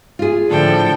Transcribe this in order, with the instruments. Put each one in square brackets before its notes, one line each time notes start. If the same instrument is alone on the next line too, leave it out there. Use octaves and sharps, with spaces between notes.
[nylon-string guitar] F4 G#4
[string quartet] A2 A4 G5 [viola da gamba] D3 F3